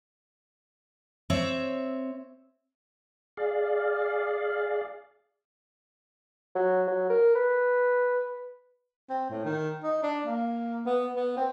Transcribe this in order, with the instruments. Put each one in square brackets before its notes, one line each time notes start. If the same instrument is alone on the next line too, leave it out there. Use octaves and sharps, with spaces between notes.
[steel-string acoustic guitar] C4 C#5 E5
[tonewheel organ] G#4 D5 F5
[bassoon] F#3
F#3
A#4
B4
[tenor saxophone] C4
A2
D#3
D#4
D4
A#3
B3
B3
C4